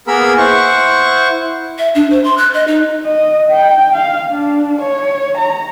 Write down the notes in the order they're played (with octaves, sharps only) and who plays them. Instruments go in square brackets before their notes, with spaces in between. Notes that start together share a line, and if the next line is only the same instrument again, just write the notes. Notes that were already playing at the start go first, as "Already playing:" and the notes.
[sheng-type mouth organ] A#3 B3 G#4 A#4 B5 E6
E4 C5 F#5 C#6
[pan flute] E5
D4
C5
C6
F#6
D#5
D#4
[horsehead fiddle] D#5
G5
F5
D4
C#5
A#5